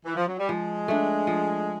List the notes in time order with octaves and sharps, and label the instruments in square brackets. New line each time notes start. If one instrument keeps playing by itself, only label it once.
[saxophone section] E3
F3
F#3
G3
[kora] F3 [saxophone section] G#3
[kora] A3 D4
F3